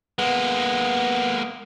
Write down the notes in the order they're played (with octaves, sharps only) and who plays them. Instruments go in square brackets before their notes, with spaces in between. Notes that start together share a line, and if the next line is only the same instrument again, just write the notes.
[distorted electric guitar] G#3 A#3 [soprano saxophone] B3